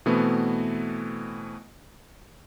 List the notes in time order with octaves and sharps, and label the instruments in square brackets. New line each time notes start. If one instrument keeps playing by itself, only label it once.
[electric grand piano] B2 E3 A3 B3 C4